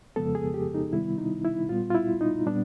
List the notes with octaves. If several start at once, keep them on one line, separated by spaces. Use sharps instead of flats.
F2 C#3 F3 G#3 B3 A4
G#4
G4
D#4
C3 D#3 G3 B3 E4
D#4
E4
A#2 G3 B3 F4
F4
E4
D#4
A#2 G3 B3 D4